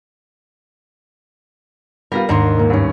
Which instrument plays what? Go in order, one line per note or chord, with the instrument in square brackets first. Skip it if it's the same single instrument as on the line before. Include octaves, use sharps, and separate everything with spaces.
[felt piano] G3 B3 F4 [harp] A#4 A#6
[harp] D#2 G#2 [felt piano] D4 A#5 C6
[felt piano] A#2 A#3
G2 C#4